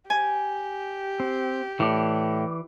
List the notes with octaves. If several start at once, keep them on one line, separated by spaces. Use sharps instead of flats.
G4 G#5
C4
A2 E3 D5